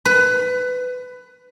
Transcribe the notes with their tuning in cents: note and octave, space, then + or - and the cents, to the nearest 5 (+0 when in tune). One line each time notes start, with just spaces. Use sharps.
B4 +20